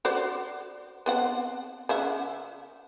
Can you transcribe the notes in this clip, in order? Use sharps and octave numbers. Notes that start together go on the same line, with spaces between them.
F#4 C5 D5
B3 C4 F#5
C#3 E5 F#5